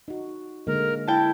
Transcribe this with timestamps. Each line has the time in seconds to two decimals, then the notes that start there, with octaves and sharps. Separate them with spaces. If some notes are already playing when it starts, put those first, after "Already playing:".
0.08 D#4 F#4
0.67 D3 G#3 A#3 A#4
1.07 E4 G5 A5